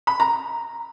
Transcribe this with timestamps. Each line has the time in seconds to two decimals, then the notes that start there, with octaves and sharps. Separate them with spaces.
0.07 B5
0.20 A#5